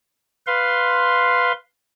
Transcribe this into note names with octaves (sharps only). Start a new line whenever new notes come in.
B4 F5 C6